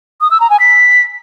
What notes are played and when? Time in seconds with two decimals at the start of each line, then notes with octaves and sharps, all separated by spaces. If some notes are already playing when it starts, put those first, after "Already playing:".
0.21 D#6
0.31 E6
0.40 A#5
0.50 G#5
0.60 B6